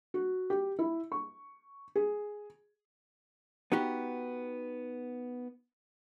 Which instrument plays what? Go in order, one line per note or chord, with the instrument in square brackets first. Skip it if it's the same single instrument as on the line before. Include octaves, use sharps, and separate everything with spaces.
[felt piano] F#4
G4
E4
C#6
G#4
[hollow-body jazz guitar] B3 D#4 F#4 G4